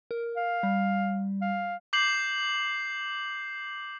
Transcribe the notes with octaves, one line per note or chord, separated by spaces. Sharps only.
A#4
F5
G3
F5
D6 G6 C7 F#7